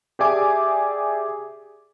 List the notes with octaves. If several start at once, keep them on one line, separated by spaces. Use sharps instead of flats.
G4 G#4 D5 E5 G#5 D6